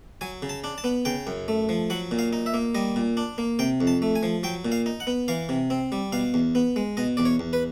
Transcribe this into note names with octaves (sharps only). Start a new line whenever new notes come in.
F#3 G#5
C#3
A5
D4
A5
B3
C#3 G5
F#2
A3
F3
F#3 F#5
A#2
F5
D#4
E5
A#3
G3 D#5
A#2
D4
A#3
C3 G5
F2
A5
A3
G#5
F3
F#3 G5
A#2
F5
D#4
F#5
B3
E3 F5
C3
C4
G3
B2 F5
E2
B3
G#3
B2 D#5
E2 D5
C#5
E2
B4